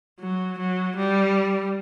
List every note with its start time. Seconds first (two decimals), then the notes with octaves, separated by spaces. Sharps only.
0.20 F#3
0.59 F#3
0.97 G3